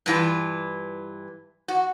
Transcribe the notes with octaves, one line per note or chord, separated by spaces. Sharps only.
G2 E3 F4
F#4